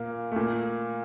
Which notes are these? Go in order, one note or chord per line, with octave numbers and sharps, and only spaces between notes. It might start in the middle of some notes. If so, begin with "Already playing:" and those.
Already playing: A#2 A#3
A3
A#2 A#3